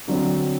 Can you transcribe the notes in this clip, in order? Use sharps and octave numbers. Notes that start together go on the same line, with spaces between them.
D3 F#3 C4